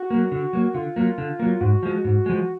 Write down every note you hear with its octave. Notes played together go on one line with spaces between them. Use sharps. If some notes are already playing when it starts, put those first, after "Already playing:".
Already playing: F#4
F#3 A#3
D3
F#3 A#3
D3 F4
F#3 A#3
D3
F#3 A#3
G#2 F#4
F3 G#3
G#2
F3 G#3